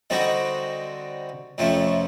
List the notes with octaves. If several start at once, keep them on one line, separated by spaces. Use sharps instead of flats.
D3 G3 C4 D#4 F#4
F2 C3 F3 A3 C#4